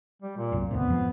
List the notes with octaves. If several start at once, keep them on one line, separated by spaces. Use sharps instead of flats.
G3
A#2
F1 C2 F#2
D2 A2 C3 B3
F2 G#2 F3